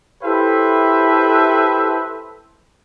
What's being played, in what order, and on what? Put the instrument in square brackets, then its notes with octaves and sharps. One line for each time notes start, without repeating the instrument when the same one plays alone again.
[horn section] E4 G4 A4 B4 C5 E5